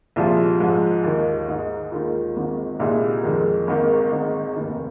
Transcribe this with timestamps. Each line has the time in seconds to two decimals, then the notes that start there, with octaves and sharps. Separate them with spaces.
0.16 C2 A#2 F3 G#3 F4
0.60 G#2 F3 G#3
1.04 D#2 D#3 A#3 D#4
1.48 G#2 G#3 D#4
1.92 D#2 D#3 G#3 F4
2.36 G#1 G#2 D#3
2.79 C2 A#2 G#3 D#4
3.23 F2 D#3 G#3
3.67 G#1 G#2 D#3 A#3
4.12 G#1 G#2 D#3 G#3 D#4
4.55 F1 D#2 D#3